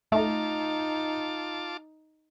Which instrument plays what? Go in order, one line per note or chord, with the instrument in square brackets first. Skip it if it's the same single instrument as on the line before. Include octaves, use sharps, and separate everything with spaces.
[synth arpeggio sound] A3 [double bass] D#4 [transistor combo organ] F4 A5 D6